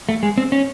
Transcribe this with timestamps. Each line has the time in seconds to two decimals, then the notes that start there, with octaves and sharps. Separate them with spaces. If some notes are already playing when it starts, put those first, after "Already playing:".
0.09 A3
0.23 G#3
0.38 C4
0.52 C#4